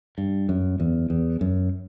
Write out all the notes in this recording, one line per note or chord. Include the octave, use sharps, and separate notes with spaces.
G2
F#2
E2
E2
F#2